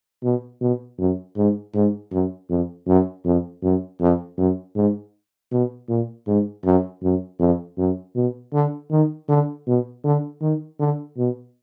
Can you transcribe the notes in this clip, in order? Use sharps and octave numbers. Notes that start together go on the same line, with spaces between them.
B2
B2
F#2
G#2
G#2
F#2
F2
F#2
F2
F#2
F2
F#2
G#2
B2
A#2
G#2
F#2
F#2
F2
F#2
B2
D3
D#3
D3
B2
D3
D#3
D3
B2